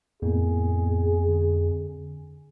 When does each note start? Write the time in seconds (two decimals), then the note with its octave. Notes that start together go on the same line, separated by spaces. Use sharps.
0.22 F2 A2 A#3 B3 G#4
1.28 D3